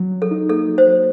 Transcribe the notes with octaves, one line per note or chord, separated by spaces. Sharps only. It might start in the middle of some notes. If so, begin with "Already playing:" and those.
Already playing: F#3
F#3
A4
D#4
A#3 A4
F#3
C5
F#3